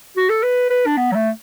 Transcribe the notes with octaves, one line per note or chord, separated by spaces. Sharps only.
F#4
A4
B4
B4
D4
B3
F#3
A3